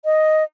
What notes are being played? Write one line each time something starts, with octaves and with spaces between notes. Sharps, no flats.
D#5